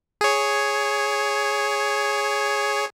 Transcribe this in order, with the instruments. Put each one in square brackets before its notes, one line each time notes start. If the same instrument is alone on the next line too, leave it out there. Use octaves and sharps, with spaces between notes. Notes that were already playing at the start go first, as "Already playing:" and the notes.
[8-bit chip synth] G#4 C#5